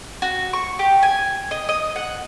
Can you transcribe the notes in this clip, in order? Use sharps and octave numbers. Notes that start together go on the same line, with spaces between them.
F#4
C#6
G4
G#5
D#5
D#5
F#5